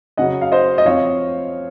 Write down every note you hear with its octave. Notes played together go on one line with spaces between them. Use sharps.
C#3 F#3 C#4 D#5 F#5
F5
C5 D#5
D#5
F3 C4 C#5 F5